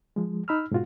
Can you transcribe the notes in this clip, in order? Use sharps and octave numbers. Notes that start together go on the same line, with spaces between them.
F3 G#3
D#4 B5 E6 F6
G#2 B2 F4 F#4